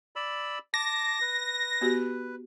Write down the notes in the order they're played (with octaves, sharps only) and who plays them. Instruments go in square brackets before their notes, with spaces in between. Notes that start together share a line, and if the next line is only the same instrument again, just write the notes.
[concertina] D5 B5 E6
[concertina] A5 D6 [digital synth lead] A#6
[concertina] B4
[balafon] B3 F#4 G4